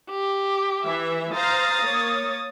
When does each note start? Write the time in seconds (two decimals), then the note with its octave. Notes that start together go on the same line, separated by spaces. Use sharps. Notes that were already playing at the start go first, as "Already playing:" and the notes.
0.10 G4
0.82 E3 E5
1.34 C5 F5 A#5 D#6 A6
1.83 A#3 C#5